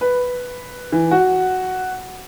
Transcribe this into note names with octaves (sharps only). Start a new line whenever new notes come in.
B4
E3
F#4